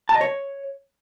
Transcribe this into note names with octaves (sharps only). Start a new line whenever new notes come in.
A5
D#5
C#5